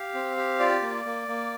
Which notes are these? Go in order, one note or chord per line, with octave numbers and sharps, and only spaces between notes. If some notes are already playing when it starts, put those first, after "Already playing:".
Already playing: G4 F5
C4
G4
F4 D5
A#3
A#3
A#3